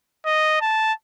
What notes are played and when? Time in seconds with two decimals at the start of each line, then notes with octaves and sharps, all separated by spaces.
0.26 D#5
0.61 A5